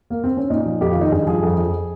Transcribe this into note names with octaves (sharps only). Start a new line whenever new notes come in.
A#3
C4
C#4
A#2 D#4
F3
F2 G4
F4
D#3 D#4
G2 G#4
F3 G#4
F2
F2